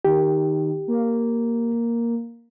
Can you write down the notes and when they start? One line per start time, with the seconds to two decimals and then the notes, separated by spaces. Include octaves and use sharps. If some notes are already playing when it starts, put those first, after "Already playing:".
0.05 D#3 G4
0.88 A#3